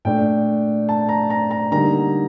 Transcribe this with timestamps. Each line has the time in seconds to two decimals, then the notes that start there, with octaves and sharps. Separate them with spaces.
0.05 A#2 A3 D4 G5
0.89 A5
1.09 A#5
1.30 A#5
1.51 A#5
1.72 D3 G3 A#3 D#4 A#5